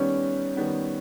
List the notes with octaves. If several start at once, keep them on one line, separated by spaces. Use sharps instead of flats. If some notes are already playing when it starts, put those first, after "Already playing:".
Already playing: D#3 G3 B3 C#4
D#3 G3 B3